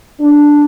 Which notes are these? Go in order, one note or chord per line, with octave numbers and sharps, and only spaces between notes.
D4